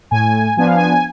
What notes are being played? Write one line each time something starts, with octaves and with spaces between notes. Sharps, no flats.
A2 G#5
F3 B3 D4 G#5
F5
G#5